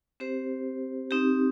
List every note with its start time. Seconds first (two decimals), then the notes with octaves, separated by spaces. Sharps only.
0.20 C4 G4 C5
1.11 C4 D#4 G4